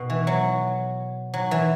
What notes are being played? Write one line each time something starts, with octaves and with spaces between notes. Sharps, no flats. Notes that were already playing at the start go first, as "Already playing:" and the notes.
Already playing: B2
E3
F#3
F#3
E3